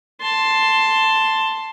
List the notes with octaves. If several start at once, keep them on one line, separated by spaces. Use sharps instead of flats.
A5 C6